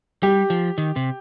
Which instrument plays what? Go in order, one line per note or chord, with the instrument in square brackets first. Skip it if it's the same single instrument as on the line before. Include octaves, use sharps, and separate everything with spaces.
[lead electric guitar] G3 [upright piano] G4
[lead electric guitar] F3
D#3
C3